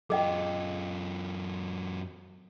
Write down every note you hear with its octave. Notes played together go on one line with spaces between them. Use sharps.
F#2 F4 G#4 D#5 G5